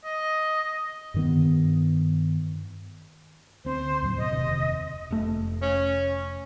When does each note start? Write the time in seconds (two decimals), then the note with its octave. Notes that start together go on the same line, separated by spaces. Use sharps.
0.04 D#5
1.14 G2 D#3 B3
3.65 D2 C4 C5
4.02 D#2 A2 F#3
4.18 B2 D#5
4.31 F1 D#2 C3
5.11 F1 A3
5.62 C#4